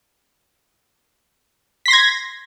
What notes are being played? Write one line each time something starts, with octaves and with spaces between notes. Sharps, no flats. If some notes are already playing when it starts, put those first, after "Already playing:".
C6 G#6 A#6 B6